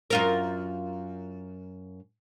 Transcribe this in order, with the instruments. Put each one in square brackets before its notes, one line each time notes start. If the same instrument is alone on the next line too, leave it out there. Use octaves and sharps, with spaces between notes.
[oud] F#2 F4 A#4